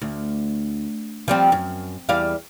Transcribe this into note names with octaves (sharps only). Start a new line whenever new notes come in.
D2
F3 G3 C4
F#2
E2 G3 F5